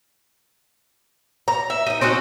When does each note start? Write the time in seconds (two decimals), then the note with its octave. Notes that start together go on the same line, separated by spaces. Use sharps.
1.48 A#5
1.70 E5
1.87 D#4 D#5
2.01 C4 C#4 D#4 F#4